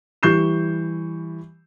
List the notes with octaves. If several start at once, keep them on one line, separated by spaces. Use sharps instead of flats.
E3 G3 C#6 G6 C7 E7